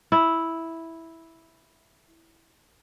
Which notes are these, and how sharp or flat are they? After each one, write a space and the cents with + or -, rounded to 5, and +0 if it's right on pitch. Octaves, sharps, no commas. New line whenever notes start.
E4 -5